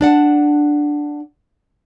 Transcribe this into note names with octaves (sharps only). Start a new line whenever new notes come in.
D4 D5 F#5 A5